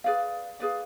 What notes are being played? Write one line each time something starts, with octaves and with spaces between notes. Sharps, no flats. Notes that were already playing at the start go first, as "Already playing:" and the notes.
G#4 B4 D5 F5
G#4 B4 D5 F5